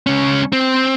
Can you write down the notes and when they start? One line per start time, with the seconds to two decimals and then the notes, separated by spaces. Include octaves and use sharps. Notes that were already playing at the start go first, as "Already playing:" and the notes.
0.07 C#2 C#4
0.53 C4